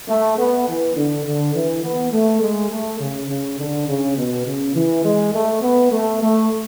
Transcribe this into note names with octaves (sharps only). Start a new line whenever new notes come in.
A3
B3
E3
D3
D3
E3
B3
A3
G#3
A3
C#3
C#3
D3
C#3
B2
C#3
E3
G#3
A3
B3
A3
A3